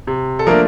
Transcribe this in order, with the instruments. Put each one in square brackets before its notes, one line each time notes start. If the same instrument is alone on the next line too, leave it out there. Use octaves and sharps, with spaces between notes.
[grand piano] C3
A4
F3 A3 A#3 D4 A#4